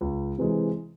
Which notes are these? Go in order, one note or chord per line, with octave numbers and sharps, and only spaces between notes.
C#2
C3 E3 G#3